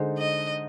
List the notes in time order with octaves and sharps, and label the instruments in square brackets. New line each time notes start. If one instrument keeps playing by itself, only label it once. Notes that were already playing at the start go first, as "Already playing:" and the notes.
Already playing: [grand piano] D3 G#3 D#4 G#4 C5
[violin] D#5